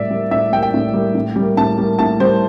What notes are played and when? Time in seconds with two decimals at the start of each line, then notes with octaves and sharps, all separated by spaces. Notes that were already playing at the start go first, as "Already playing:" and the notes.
Already playing: A2 G3 A#3 D5 E5
0.10 G3 A#3
0.31 A2 E5
0.52 G3 A#3 G5
0.63 G5
0.74 A2
0.94 G3 A#3
1.15 A2
1.36 G3
1.41 A#3
1.57 A2 A5
1.78 G3 A#3
1.99 A2 A5
2.20 G3 A#3 C5